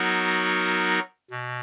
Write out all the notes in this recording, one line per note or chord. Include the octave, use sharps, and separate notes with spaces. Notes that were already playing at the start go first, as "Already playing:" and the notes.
Already playing: F#3 B3 D#4 F#4 A#4
B2